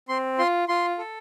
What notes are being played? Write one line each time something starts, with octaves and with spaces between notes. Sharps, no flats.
C4 C6
F4 C6
F4 C6
A4